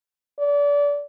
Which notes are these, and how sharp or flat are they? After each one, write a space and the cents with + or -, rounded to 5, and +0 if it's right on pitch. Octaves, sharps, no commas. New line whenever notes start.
D5 -30